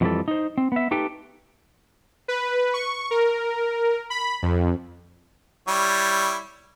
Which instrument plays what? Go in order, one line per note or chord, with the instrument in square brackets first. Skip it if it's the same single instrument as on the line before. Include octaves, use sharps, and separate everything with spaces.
[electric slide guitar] F2 A2 E3 F3 G3 A4
D#4 C5
C4
B3 E5
A3 D#4 G4 A4 B4 G5
[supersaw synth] B4
C#6
A#4
B5
F2
[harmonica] G3 E4 C#5